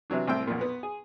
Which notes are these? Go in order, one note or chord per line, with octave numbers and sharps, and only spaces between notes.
C3 E3 F#3 D4
C2 A2 C4 E4 G5 E6
B1 F2 A#2
B3
G#4